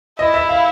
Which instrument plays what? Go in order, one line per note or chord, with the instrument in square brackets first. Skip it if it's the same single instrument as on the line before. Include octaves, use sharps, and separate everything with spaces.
[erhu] E4 [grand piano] D#5
[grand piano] E5
F5